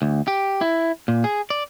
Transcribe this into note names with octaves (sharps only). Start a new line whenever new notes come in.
D2
G4
E4
A#2
G#4
D5